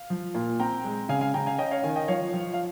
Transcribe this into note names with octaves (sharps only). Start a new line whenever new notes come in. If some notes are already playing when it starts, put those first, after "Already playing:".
Already playing: F5
F3
A#2
C4 G5 A#5
G#3
C#3 F5 G#5
F5 G#5
C#3 G5 A#5
F5 G#5
C#4 D#5 G5
C#5 F5
D#3 F5 G#5
D#5 G5
F3 C#5 F5
F3
F5